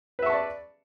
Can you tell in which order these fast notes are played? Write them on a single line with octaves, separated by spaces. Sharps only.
B4 E5 C#6 A5 D5